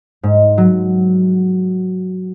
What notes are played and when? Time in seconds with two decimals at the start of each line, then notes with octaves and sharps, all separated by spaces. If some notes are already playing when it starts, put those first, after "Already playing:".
0.23 G#2
0.58 F#3